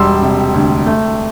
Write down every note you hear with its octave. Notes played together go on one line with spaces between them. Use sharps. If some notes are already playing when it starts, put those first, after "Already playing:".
Already playing: E1 G3 C6 E6
C3
D2
A3